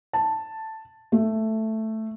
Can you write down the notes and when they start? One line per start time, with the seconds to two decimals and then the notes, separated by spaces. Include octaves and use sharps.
0.13 A5
1.12 A3